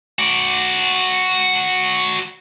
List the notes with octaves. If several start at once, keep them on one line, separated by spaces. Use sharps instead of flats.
F#4 D5